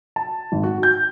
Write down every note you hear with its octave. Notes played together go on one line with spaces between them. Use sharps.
A5
G#1
F#4
G6